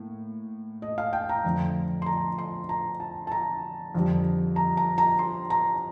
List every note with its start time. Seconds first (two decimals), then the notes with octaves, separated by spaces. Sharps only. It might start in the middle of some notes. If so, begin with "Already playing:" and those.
Already playing: A2 A#3
0.82 D#5
0.98 F5
1.13 G5
1.29 A#5
1.44 F2 D3 A3
2.02 C6
2.06 A#5
2.38 C6
2.69 A#5
3.00 A5
3.27 A5
3.32 A#5
3.95 F2 D3 G3
4.56 A#5
4.77 A#5
4.98 A#5
5.19 C6
5.50 A#5